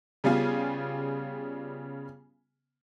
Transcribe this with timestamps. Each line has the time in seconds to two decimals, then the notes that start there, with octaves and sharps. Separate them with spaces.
0.24 C#3 G3 B3 F4 G#4